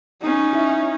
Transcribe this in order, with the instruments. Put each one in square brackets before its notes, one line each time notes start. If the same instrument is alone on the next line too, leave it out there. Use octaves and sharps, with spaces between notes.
[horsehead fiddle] C#4 D#4
[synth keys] E4 E5